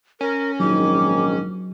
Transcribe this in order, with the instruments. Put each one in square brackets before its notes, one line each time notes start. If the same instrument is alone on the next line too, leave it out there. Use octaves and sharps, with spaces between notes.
[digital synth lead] C#4 [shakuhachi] A#4
[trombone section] A#1 G#2 D#3 [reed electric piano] F#3 [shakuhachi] D6